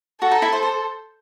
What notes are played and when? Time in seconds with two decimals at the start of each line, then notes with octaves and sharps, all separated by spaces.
0.21 F#4 A4
0.31 D#4 D#5
0.42 E4 E5
0.53 C5
0.63 C5